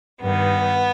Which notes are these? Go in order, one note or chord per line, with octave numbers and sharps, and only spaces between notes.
G2 D#3 B3